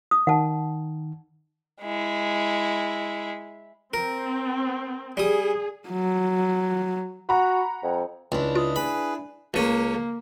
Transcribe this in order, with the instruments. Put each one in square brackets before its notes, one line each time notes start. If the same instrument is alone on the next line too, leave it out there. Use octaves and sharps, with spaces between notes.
[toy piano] D#6
[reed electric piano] D#3 [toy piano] F#5 A5
[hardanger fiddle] G#3 E4
[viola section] C4 [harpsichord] A#4
[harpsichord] G3 D#6 [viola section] G#4
[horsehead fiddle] F#3
[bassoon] F#4 [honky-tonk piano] F#5 A#5 B5
[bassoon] F2
[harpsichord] C#2 [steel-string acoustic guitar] D4 E4
[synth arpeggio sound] F4 [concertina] D#5
[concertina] G#4 B4 [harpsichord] B5
[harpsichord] C#2 C#4 [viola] A#3